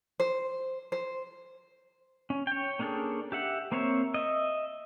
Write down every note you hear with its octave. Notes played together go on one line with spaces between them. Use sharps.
C5
C5
C#4
C#5 G5
A#3 C#4 D4 G#4 A4
G4 E5 F#5
A#3 C4 C5 C#5 E5
D#5 E5